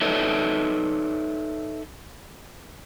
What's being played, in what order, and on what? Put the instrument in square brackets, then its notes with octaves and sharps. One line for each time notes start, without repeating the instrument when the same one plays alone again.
[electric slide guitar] D#4 A4 B4 C#5 D5 E5